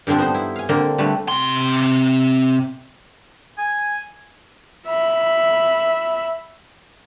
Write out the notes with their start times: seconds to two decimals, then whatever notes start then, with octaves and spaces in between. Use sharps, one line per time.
0.07 G2 D3 F3 C4 D4
0.18 B3 D#4 C5
0.35 E4
0.56 F5 G#5
0.69 D3 A#3 C4 A#5
0.98 D3 G3 A3 B4
1.28 C3 C6
3.58 G#5
4.86 E5 B5